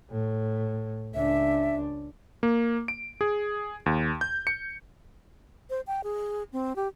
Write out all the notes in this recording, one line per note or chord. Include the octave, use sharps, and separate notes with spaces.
A2
C#2 D4 E5
A#3
D7
G#4
D#2
G6
C#7
C5
G5
G#4
C4
G4